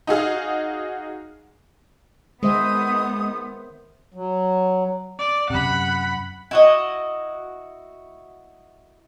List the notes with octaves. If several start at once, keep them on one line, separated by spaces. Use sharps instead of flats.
D#4 F#4 G#4 F5
D#3 G#3 B3 C5 E5 D#6
F#3
D5
F#2 C3 F#5 B5
E4 F#4 D#5